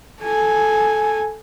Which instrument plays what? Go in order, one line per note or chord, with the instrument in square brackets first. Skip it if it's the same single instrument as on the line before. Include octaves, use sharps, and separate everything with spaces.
[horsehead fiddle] A4 G#5